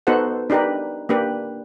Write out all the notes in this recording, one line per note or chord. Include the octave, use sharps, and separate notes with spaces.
B3 D#4 F#4 A4 C5 F#5
D4 D#4 G4 A#4 B4
A#3 D4 G4 B4